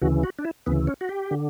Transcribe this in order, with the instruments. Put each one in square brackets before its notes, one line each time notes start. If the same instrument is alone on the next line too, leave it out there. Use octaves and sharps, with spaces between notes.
[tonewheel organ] D2 C#3 E3 F#4
F#4
D4
E4
D2 C#3 E3 B3
C#4
F#4
G4
D3